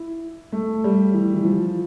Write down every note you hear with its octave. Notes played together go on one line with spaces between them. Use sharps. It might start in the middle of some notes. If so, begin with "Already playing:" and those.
Already playing: E4
A3
G3
E3
E3
F3